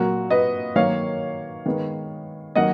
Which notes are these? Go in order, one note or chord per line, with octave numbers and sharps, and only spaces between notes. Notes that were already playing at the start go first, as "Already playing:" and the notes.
Already playing: A#2 F#3 A#3 F#4 A#4
B4 D#5
D#3 F#3 A#3 C#5 F5
D#3 G#3 B3
D#3 F#3 A#3 D#5 F#5